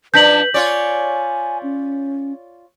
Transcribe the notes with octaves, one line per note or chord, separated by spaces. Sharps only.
F3 D4 B4 G6 B6 F#7
F4 C#5 D5 G#5
C#4